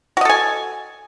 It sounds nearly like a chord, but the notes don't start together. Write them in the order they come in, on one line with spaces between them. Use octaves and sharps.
F#4 D#5 A4 G#5